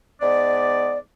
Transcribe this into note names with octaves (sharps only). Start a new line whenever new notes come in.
G#2 B3 D5